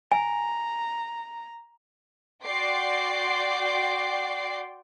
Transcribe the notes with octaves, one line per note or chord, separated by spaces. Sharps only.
G#5 A#5
F#4 D5 G5 C6 D6 C7